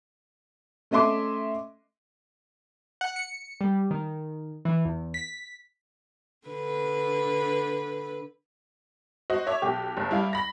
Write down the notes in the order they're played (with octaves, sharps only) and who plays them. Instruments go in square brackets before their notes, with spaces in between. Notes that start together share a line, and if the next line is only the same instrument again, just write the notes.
[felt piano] A3 C#4 D#5 E5 C6 D6
[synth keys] F#5
C#7
G3
D#3
E3
E2
B6
[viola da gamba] D3 B4
[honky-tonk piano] F#4 C5 D#5
C#5 E5 D6
B1 G4
F#1
G3 E4 F5
B5 A#6